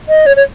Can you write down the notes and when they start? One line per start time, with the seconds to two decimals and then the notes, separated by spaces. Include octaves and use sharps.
0.09 D#5
0.26 C#5
0.36 C#5